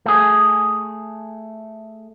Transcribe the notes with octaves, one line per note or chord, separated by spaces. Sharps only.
A3 G#4